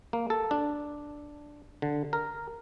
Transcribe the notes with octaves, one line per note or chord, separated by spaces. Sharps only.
A#3
A4
D4
D3
A#4